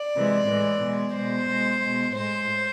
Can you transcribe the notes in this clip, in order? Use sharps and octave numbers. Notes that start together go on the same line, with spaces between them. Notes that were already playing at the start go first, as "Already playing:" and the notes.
Already playing: D5
C3 E3 G#3
A2 E3 G#3
B2 G#3
B2 G#3 C5
B2 G#3
B2 G#3
A2 G#3 C5